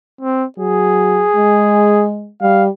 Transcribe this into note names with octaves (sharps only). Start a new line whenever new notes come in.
C4
F#3 G#4
G#3
G3 F5